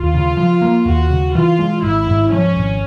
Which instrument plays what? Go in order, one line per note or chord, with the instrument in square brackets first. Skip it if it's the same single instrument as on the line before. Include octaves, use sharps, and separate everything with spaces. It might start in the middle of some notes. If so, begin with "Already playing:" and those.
Already playing: [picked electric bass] D#2 [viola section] F4
[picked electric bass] C#3
F3
A#3
[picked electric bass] D#2 [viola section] F#4
[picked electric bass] C#3
[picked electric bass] E3 [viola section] F4
[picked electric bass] G#3
[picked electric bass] G#1 [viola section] E4
[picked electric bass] G#2
[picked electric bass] F3 [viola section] C#4
[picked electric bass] G#1